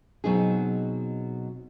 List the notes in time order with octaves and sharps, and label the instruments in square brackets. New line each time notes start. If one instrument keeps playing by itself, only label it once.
[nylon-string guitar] B2 F#3 C4 D#4 G#4